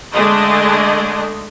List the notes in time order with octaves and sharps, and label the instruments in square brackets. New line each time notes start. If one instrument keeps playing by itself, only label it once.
[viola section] D3 G#3 A3 D4 G#4 D#5